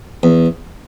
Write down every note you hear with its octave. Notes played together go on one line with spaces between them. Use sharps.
E2